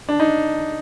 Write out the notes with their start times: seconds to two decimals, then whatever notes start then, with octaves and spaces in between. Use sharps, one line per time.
0.09 D4
0.20 D#4